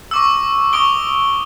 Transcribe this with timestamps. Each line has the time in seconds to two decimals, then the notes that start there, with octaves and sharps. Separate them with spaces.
0.11 C#6 D6 E6
0.73 C#6 D#6 D7 G7